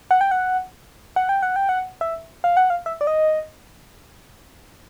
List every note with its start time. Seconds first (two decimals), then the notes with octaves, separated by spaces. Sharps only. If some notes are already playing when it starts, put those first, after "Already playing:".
0.11 F#5
0.21 G5
0.31 F#5
1.16 F#5
1.29 G5
1.42 F#5
1.56 G5
1.69 F#5
2.01 E5
2.44 F5
2.57 F#5
2.70 F5
2.86 E5
3.01 D5
3.07 D#5